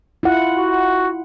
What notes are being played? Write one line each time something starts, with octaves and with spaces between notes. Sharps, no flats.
E4 F4 F#5
F#4